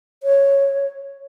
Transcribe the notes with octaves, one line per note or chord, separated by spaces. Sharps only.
C#5